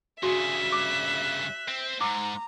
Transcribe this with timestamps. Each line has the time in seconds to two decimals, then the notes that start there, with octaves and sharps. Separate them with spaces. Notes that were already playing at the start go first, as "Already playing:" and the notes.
0.23 G2 C#3 F#4 G#4 E5
0.72 D6 F#6
1.68 C4
2.01 G#2 A#5 D6 E6